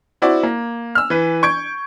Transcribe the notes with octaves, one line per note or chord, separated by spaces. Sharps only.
C4 E4 F#4 D5
A#3
E6 F6
E3 B4
C#6 G6 G#6 D7